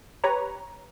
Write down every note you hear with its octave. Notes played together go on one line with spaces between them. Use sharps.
G4 B4 C#5 A#5